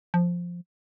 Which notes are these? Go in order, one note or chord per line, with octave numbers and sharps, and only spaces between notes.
F3